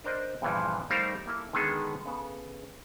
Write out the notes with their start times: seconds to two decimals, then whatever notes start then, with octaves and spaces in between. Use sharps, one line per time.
0.04 D4 A#4 C5 D5 D#5
0.42 E2 G2 A#2 D3 E3 F3
0.90 G3 A3 D#4 A#4 C5 F5
1.26 A#3 E4 A4
1.53 D3 D#3 G#3 B3 G#4 A4
2.06 C#3 B3 A4